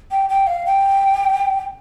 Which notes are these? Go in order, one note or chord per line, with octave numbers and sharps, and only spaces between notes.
G5
G5
F5
G5